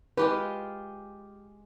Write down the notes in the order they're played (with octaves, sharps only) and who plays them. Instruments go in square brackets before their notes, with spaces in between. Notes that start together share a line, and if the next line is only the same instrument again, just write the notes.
[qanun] G#3 F4 G4 [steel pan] B4